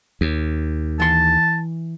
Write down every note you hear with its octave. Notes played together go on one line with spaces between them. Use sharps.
D#2
E3 A5 C6